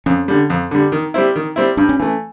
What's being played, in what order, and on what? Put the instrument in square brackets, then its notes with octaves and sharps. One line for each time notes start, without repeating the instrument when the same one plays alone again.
[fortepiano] F2 [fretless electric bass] C#4
[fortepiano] D3 G3
F2
D3 G3
D#3
G3 C4 E4
D#3
G3 C4 E4
[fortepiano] G2 [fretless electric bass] D4
[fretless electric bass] C#4
[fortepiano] E3 A3 [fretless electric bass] C#4